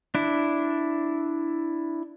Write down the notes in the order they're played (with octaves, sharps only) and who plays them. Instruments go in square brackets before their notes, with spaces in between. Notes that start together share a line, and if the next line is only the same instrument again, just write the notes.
[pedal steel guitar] D4 E4